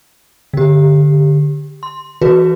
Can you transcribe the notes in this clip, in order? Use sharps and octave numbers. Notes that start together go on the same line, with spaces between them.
D3 G4
C6
E3 F#4 G#4 B4